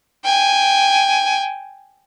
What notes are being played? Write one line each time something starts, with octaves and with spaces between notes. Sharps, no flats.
G5 G#5